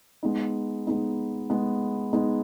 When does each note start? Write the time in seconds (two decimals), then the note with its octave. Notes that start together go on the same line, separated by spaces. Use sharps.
0.23 G#3 B3 D#4
0.87 G#3 B3 D#4
1.50 G#3 B3 D#4
2.13 G#3 B3 D#4